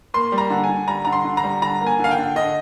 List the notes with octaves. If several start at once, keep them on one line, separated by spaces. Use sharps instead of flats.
A#3 C6
G3
A#5
D3
G#5
D3
G3 A#5
D3 A#5
C6
D3
A#5
G3
D3 A#5
A#3
G#5
D3 F5
G5
D3
D3 D#5